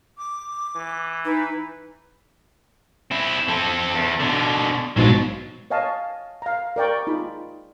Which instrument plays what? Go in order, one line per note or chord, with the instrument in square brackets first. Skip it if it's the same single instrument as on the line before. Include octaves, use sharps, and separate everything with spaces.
[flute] D6
[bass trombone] E3
[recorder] D#4 [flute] B4
[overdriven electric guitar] C4 E4
C4 A4
E2
B2 D3
[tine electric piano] A#1 G#2 B2 [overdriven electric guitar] F#3 F4
[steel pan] C#5 D#5 F5 G#5 A5
F5 A#5
A#4 D5 G5 C#6
D#4 F4 G#4 B5